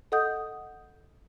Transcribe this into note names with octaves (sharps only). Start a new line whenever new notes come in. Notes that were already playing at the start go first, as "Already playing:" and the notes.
A4 D#5 F#5 D#6 G6